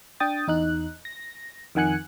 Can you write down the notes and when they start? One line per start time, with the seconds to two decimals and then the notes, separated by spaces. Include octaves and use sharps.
0.20 D4 G5 D#6 A6
0.48 E2 D#4 F#6
1.05 A#6
1.75 F2 D#3 F#5 G#5 F#6 C#7